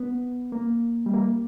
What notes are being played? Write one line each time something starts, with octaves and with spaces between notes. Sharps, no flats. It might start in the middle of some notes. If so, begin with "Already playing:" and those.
Already playing: B3
A#3
G3
A#3